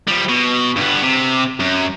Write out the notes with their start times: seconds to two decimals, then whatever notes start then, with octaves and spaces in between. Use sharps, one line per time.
0.07 F3 G3
0.29 B2
0.77 G2 B3
1.02 C3
1.60 F#2